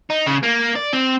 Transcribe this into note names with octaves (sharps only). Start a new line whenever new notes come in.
D#4
C#3
A#3
D5
C4